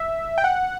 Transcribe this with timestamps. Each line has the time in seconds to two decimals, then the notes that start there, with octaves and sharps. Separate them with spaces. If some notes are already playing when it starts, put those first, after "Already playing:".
Already playing: E5
0.38 G5
0.44 F#5